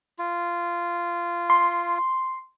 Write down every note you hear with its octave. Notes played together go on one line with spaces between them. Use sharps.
F4
C6